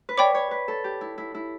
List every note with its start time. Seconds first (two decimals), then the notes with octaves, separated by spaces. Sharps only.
0.09 B4
0.17 C#5 D5 G5 B5 D6
0.35 C#5
0.51 B4
0.68 A4
0.84 G4
1.01 E4
1.18 E4
1.35 E4